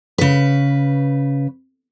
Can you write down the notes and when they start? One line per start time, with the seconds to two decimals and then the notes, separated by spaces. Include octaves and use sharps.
0.18 C#3 B4